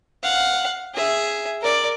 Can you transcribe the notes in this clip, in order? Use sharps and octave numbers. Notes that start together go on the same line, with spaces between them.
F5 F#5
G#4 E5
A#4 D5